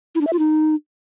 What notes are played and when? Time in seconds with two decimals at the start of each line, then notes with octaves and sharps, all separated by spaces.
0.15 E4
0.21 D4
0.27 E5
0.33 F4
0.39 D#4